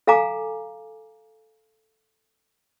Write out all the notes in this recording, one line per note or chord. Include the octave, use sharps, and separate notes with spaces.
A4 F5 G#5 A#5 D6